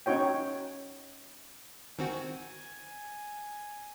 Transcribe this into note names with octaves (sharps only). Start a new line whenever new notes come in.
C#4 D#4 F#4 C#5 G5
D#3 C4 F#4 G#5